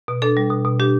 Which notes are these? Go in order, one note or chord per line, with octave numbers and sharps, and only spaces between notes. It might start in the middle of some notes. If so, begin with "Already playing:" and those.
B2
D4 A4
G3
B2
B2
D4 G4